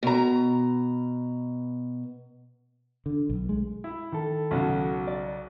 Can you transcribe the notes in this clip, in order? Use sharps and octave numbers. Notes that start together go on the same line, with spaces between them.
B2 A#5
D3
B1
G#3
E4
D#3 A4
B1 C#3 F#4
D5